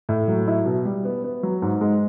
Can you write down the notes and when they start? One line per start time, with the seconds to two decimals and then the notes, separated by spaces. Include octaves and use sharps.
0.09 A2
0.28 F#3
0.48 E4
0.66 B2
0.85 G3
1.05 B3
1.24 B3
1.43 F#3
1.62 G#2
1.81 G#3